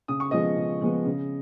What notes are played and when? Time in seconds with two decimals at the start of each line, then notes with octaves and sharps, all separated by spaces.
0.08 C#3 D#6
0.20 C#6
0.31 F3 G#3 B3 D#5 D#6
0.57 C#3
0.81 F3 G#3 B3
1.06 C#3